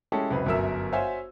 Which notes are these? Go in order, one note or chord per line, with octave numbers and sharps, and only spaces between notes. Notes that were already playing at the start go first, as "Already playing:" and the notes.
G#3 C#4 E4 G4 A4
C#2 F#2 C4 B4
G1 F#2 F#3 A#4 E5 E6
F#4 C5 C#5 E5 F5 G#5